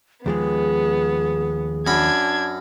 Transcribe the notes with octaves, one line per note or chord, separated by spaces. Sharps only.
D#2 F3 G#3 B3 G#4
F#2 D4 B5 G#6